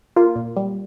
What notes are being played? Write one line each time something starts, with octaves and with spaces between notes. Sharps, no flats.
A#3 F4
A#2
G3